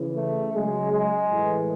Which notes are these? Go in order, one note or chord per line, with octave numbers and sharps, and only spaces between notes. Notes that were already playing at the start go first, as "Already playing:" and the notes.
Already playing: C#3 E3
A3
C#3 F#3 G#3
G#3
A2 E3